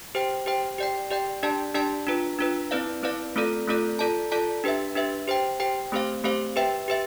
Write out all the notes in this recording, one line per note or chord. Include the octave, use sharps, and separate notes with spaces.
G4 C5 G5
G4 C5 G5
G4 D5 G5
G4 D5 G5
D4 G4 D5 A5
D4 G4 D5 A5
D4 F4 B4
D4 F4 B4
C4 E4 B4 D5 F5
C4 E4 B4 D5 F5
A3 C4 F4 A4 D5
A3 C4 F4 A4 D5
F4 A4 D5 A5
F4 A4 D5 A5
D4 G4 B4 E5
D4 G4 B4 E5
G4 C5 G5
G4 C5 G5
A3 C4 G4 C5 F5
A3 C4 G4 C5 F5
G4 B4 E5 G5
G4 B4 E5